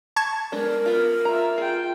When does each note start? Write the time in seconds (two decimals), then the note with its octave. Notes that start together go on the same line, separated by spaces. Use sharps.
0.16 A5 C#6 G#6
0.52 G#3 B3 D4 A#4
0.86 B3 F4
1.25 F4 E5 A#5
1.58 F4 G#4 G5